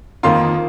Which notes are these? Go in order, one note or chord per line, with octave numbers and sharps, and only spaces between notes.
F2 D#3 A#3 F4 C6